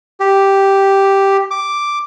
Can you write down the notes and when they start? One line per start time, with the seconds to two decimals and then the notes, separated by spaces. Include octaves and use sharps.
0.20 G4
1.51 D6